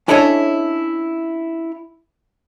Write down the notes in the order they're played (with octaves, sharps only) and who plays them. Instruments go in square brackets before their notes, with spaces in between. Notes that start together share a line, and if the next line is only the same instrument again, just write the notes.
[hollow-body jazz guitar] C#4 D4 E4 A4 C#5 D#5